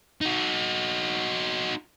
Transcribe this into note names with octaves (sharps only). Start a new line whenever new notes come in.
D#4 F#4